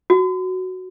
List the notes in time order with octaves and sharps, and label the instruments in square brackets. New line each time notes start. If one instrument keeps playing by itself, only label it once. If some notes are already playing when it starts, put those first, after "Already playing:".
[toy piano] F#4